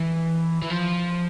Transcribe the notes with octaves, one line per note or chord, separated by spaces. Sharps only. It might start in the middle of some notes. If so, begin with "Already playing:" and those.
Already playing: E3
E3
F3